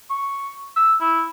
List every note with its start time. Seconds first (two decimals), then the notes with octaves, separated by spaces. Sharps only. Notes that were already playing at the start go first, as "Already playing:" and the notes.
0.10 C#6
0.76 E6
1.01 E4